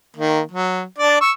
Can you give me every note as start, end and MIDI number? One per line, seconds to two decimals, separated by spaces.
0.16 0.41 51
0.16 0.41 58
0.51 0.82 54
0.98 1.20 62
0.98 1.20 74
1.21 1.31 85
1.21 1.31 88